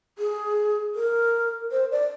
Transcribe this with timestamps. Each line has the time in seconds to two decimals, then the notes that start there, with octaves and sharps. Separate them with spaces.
0.18 G#4
0.95 A#4
1.72 C5
1.92 D5